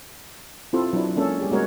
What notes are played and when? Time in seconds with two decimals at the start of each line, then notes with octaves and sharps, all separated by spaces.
0.73 C4 E4 F4 A4
0.93 F#3 D4 E4
1.16 G#3 A#3 C#4 A4
1.40 G3 G4 G#4
1.51 G#3 A#3 B3 F#4 A#4 C#5